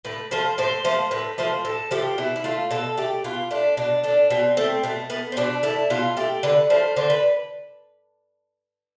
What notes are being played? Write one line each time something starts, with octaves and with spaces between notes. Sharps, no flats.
A2 B4
F3 A3 C5
A2 C5
F3 A3 C5
A2 B4
F3 A3 C5
A2 A4
F3 A3 G4
B2 E4
E4
A3 F4
B2 A4
A3 G4
B2 F4
A3 D4
B2 D4
A3 D4
B2 C4
A3 C4
B2 A3
A3 B3
C4
B2 D4
A3 E4
B2 F4
A3 G4
D3 B4
F3 A3 C5
D3 C5
B4